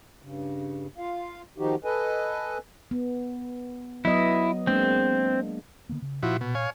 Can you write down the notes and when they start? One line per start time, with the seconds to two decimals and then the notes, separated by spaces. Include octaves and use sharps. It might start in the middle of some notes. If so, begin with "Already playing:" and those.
0.22 G2 C#3
0.98 F4 F5
1.58 D#3 F3 D#4 F#4 G4
1.84 A4 B4 D#5 G#5
2.91 B3
4.05 F#3 B3 E4 D#5
4.67 G#3 A#3 C4 D4
5.89 D3 A#3 B3
6.02 C#3
6.23 A#2 F3 E4 F#4
6.41 B2
6.55 C#5 F5 G#5